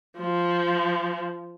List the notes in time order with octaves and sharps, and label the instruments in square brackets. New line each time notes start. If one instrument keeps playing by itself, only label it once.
[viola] F3